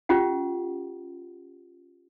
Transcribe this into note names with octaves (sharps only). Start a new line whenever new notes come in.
C#4 F4 G4 F#5